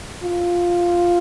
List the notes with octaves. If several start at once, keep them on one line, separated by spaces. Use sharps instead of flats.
F4